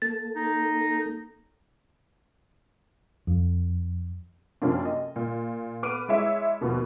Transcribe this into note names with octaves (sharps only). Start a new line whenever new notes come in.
A#3 A4 A6
D#4
F2
F#2 C3 F3 A#3 C#4 D4
D#5
A#2
B3 B4 D6 F6 D7 D#7
G#3 E4 C#5 E5
D#2 B2 F3 B3